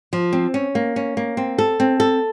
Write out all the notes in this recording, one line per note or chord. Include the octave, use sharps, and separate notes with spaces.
F3
C4
C#4
A#3
C#4
A#3
C4
A4
C4
A4